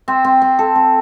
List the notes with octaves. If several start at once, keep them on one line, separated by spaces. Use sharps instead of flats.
C4
C4
C4
A4
C4